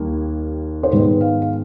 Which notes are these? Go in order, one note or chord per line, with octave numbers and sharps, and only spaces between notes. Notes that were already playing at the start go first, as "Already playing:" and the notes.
Already playing: D#2 D#3 G3 A#3
C5
G#2 D#3 G#3 B3 B4
F5
F5